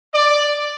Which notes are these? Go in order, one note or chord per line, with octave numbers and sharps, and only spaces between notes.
D5